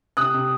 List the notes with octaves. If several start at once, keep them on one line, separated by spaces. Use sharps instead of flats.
C3 D#6 F#6
C3